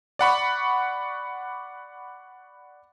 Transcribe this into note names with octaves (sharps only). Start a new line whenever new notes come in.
D5 F#5 B5 C#6